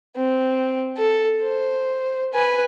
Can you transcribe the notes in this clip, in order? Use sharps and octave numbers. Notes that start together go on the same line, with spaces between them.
C4
A4
C5
B4 G#5